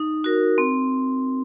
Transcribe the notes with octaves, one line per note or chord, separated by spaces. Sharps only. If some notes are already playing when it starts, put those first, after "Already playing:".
Already playing: D#4
F#4 A#4
C4